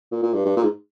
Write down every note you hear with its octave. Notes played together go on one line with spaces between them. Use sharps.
A#2
A#2
G2
G2
A#2
G#2